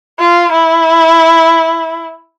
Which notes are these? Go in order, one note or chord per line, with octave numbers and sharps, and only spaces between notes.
F4
E4